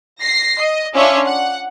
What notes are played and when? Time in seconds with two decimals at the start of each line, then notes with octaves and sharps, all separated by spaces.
0.22 A#6 C7
0.60 D#5
0.95 C#4 D4 F4 C#5 E5 C#6
1.26 F#5